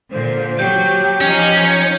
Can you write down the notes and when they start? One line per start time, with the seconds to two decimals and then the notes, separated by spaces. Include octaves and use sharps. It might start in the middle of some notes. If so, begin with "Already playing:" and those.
0.12 A#2 D3 C5
0.59 F#3 G4 G6
1.21 F3 C#4 D#4